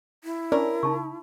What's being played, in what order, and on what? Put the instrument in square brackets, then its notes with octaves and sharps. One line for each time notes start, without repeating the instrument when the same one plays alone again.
[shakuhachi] E4
[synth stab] C#4 D4 [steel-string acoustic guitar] A#4
[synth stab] C#3 [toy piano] D#4 A5 C#6